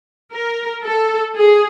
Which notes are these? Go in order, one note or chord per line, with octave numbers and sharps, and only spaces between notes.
A#4
A4
G#4